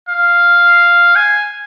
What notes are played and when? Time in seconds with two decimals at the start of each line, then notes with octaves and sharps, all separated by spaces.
0.09 F5
1.16 G#5